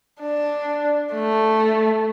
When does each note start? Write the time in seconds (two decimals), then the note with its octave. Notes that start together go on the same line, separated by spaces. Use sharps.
0.21 D4
1.14 A3